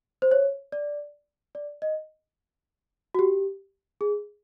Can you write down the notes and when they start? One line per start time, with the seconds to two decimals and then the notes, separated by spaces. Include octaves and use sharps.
0.22 C5
0.31 C#5
0.72 D5
1.55 D5
1.82 D#5
3.15 F#4
3.19 G4
4.01 G#4